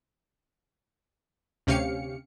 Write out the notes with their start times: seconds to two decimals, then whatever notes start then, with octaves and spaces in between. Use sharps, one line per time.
1.67 D2 C3 C#4 G4 F5 C#7